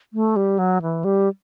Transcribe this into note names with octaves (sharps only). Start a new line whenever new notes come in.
A3
G3
F#3
E3
G3